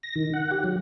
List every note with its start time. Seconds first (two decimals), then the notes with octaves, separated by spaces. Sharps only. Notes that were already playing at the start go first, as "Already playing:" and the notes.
0.03 A#6
0.16 D#3
0.33 F#5
0.51 G4
0.64 F#3